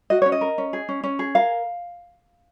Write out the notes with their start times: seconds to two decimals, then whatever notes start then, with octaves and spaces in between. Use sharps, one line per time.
0.10 F#4 D#5
0.22 C#4 C#5
0.32 D#5
0.41 A#4
0.58 C#4
0.73 G#4
0.89 C#4
1.04 C#4
1.19 G#4
1.35 A#4 F5